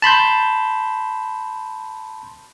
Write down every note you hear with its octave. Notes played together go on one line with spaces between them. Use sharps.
A5 B5 C6 G6